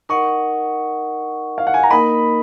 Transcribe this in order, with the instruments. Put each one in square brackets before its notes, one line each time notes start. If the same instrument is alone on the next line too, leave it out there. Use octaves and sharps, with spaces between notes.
[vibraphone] D#4 A#4 D#5 F#5 [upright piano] C#6
[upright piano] F5
F#5
G#5
A#5
[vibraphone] A#3 D#4 A#4 D#5 [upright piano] B5